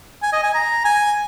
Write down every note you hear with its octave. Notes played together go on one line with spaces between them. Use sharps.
G#5
D#5
G#5
A#5
G#5